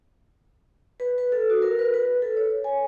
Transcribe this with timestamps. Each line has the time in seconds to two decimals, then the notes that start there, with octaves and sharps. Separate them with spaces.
1.00 B4
1.18 B4
1.32 A4
1.50 F#4
1.62 A#4
1.79 B4
1.94 B4
2.22 A4
2.37 C#5
2.64 G#5